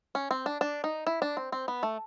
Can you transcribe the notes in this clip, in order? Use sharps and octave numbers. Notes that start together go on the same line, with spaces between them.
C#4
C4
D4
D4
D#4
E4
D4
C4
C4
B3
A3